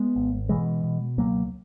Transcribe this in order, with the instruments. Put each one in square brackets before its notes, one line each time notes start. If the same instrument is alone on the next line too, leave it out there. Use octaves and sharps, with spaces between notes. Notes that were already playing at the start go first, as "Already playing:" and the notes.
Already playing: [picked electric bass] G#3 B3
G#1
B2 E3 G#3
B2
C#2 F#3 A#3